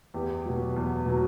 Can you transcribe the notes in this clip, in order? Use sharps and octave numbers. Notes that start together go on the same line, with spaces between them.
E2 G4
B2 F#3
E2
B2 F#3